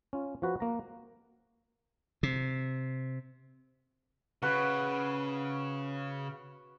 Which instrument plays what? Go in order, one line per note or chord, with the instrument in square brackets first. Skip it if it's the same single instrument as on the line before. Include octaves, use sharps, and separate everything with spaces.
[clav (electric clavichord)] C#4 F4
F3 F#4 B4
A#3 A#5
[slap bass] C3
[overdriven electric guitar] C#3 [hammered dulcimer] F#4 B4